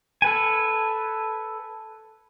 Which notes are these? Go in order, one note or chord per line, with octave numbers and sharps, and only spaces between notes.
A4 B4 G#5